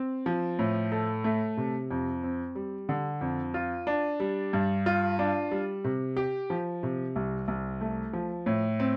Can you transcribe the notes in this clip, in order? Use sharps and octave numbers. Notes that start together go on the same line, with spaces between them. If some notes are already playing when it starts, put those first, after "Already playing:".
Already playing: C4
F3
A2
A4
A3
C3
F2
C4
G3
D3
F2
F4
D4
G3
G2
F4
D4
G3
C3
G4
F3
C3
C2
C2
A3
F3
A2
C4